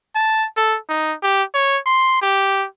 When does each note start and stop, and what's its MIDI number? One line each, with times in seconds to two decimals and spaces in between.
0.15 0.46 81
0.57 0.78 69
0.89 1.14 63
1.23 1.43 67
1.54 1.78 73
1.86 2.19 84
2.22 2.66 67